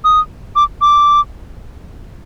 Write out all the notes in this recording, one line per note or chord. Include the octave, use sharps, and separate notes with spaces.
D#6
D6
D6